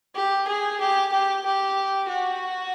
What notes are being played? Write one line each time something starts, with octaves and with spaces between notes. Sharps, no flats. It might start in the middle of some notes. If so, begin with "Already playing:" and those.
G4
G#4
G4
G4
G4
F#4